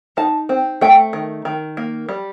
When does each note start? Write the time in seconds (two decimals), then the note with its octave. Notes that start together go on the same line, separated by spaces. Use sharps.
0.17 D#4 A5
0.49 C4
0.81 A3 G5
1.13 D#3
1.45 D#3
1.77 A#3
2.09 G3